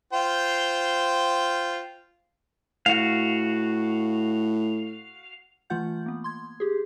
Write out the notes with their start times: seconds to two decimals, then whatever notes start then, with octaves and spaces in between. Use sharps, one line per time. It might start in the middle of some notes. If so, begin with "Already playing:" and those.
0.13 F4 C5 G5
2.86 A2 F#4 F5
5.70 E3 A3 F4 F#5 G6
6.06 A#3 B3
6.24 C6 G#6
6.60 G4 G#4